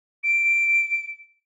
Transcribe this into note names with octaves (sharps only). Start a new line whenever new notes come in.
D7